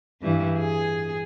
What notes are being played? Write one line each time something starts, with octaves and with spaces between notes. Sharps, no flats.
G2 E3 G3
G#4